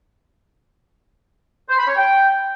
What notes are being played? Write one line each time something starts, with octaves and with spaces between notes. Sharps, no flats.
C5
B5
C#5
G5